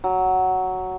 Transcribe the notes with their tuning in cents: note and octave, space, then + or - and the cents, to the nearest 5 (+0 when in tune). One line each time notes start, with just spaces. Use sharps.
F#3 +5